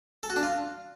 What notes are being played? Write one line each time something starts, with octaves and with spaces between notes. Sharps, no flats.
A4
F#4
D4
F4